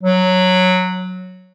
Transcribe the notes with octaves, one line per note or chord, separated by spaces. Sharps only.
F#3